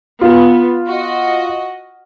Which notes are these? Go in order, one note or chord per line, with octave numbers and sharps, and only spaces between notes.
B3 F4
F#4 D#5